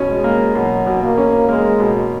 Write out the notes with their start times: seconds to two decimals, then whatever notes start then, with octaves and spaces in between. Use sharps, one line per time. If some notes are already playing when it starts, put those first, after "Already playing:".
Already playing: B2 C#4
0.09 G#3
0.24 A#3
0.55 B2 F#3
0.86 B2
1.02 A#3
1.18 C#4
1.49 G#3 A#3
1.80 B2